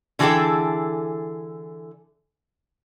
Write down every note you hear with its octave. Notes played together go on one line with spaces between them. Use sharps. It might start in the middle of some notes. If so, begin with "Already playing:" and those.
D3 E3 F#4 G#4 A4 G5